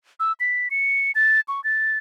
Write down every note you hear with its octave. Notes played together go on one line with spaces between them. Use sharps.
E6
B6
C#7
A6
C#6
A6